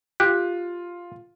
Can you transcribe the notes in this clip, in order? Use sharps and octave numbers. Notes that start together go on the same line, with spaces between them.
F4 G4 F#6